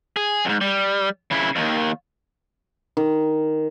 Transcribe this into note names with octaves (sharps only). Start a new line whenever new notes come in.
G#4
F2 G#2
G3
C#3 E4
D#2 D#3
D#3